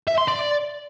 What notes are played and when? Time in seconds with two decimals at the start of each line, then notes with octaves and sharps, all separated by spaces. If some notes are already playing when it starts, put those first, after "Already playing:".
0.07 E5
0.18 C6
0.28 D5